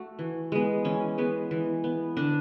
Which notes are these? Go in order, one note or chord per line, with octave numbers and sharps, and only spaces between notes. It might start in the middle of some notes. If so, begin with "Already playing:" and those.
Already playing: A3 F#4
E3
G#3 B3
E3 C#4
G#3 B3
E3
B3
D3 D4